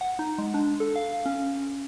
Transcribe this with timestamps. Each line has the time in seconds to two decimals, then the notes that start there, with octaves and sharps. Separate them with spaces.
0.01 F#5
0.19 D#4
0.38 G#3
0.54 D4
0.80 A4
0.96 F5
1.26 C#4